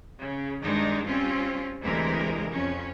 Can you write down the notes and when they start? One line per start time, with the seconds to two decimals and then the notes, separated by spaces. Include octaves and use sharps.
0.21 C#3
0.63 G2 D#3 G#3 D4 D#4
1.07 G3 C4 C#4 F4
1.81 D2 C3 E3 G#3 A#4
2.52 F2 C#4